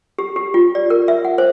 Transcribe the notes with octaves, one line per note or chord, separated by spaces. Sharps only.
G4
G4
F4
D5
A#4
E5
F#5
C5